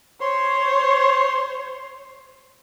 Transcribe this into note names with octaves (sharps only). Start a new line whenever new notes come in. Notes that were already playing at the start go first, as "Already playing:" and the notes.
C5 C#5 C6